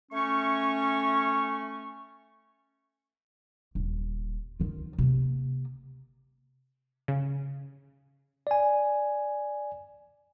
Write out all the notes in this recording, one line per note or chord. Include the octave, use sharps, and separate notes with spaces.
A3 C#4 C#6
D#1
D#3 F4
C3 A#3
C#3
D5 G#5